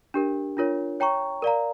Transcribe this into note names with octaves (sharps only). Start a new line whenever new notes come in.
D4 G4 A#4
D4 F4 A#4 C#5
C#5 G5 A#5 C#6
A#4 D5 F5 A#5